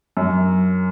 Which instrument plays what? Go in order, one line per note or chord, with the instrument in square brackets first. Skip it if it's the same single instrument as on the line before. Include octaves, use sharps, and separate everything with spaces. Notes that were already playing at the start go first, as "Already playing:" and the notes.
[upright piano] F#2